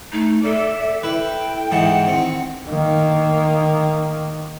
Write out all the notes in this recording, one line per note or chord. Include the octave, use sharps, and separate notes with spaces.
A3 D#4
A4 D5 E5
E4 B4 G5
G#2 E3 F#5 A5
D#3 C4
D#3 A#3